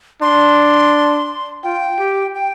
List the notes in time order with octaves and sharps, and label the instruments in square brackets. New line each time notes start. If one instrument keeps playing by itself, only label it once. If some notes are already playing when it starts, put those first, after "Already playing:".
[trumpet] D4 [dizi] C6
[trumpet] F4 [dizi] G5
[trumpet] G4
[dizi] G5